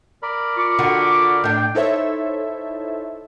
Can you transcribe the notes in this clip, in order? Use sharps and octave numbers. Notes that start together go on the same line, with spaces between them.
A#4 D5 B5
F4 C#6 D6
D3 F#4
A2 D4 G5
D#4 E4 A4 C5 C#5 E5